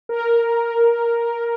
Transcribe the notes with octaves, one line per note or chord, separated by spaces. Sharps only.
A#4